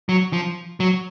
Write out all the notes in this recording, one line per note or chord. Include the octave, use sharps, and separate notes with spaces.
F#3
F3
F#3